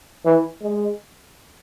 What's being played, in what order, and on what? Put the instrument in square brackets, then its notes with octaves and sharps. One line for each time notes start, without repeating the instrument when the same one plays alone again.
[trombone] E3
G#3